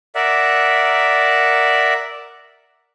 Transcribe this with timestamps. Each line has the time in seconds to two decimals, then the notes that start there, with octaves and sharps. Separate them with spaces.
0.15 A#4 D5 E5 F#5